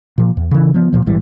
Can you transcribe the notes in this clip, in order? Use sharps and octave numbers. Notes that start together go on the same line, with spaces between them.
A#2 F3
E2
C#3 E3
F3 B3
D1 D2 A#2 F3
A#1 G#2 E3 G3